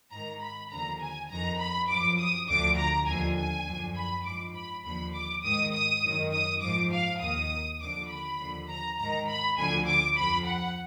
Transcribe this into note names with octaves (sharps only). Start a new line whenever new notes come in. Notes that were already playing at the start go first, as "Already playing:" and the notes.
G#2 D#3 A#5
B5
D#2 D3 F3 A#5
G#5
F2 D#3 A#5
B5
F#2 F3 D6
D#6
D2 D3 F3 D6
A#5
D#2 D3 F3 G#5
G#5
F#2 D3 F3
B5
G#2 F3 D6
B5
D#2 D3 F3 B5
D6
G#2 D#3 D#6
D#6
F#2 D#3
D#6
G#2 F3 D6
F5
D#2 D#3 D#6
D#2 D3 F3 D6
B5
D#2 D3 F3
A#5
G#2 D#3 A#5
B5
D2 D3 F3 G#5
D6
F2 F3 B5
F#5